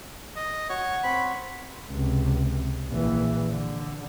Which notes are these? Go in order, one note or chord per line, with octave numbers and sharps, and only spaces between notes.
D#5
F#4 C#5
C4 B5
C#2 C3
A#1 E3
D3